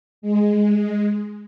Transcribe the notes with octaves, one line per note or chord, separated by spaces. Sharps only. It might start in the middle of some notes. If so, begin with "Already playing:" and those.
G#3